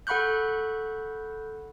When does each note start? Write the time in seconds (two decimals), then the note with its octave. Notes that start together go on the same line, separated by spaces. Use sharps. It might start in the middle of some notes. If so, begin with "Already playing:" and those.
0.07 A4 F#5 B5 C#6 F#6 G6